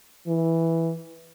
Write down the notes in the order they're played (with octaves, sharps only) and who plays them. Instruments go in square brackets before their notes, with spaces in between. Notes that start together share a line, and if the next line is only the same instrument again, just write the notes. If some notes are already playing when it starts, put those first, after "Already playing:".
[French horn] E3